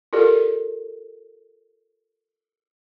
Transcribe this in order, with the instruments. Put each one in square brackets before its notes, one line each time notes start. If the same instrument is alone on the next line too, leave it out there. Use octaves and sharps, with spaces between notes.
[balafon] F4 G4 A4 A#4 D5